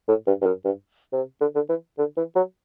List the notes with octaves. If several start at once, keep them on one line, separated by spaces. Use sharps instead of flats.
A2
G2
G2
F#2
G2
C3
D3
D3
E3
D3
E3
F#3